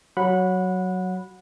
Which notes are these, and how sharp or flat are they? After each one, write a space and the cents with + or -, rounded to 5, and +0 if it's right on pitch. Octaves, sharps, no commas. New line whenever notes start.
F#3 +5 F#5 -20 B5 +0